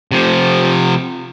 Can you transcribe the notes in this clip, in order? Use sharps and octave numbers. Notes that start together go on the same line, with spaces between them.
C3 F3